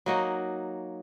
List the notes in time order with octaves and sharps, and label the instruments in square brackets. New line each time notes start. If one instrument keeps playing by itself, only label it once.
[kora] F#3 A#3 D#4 F#4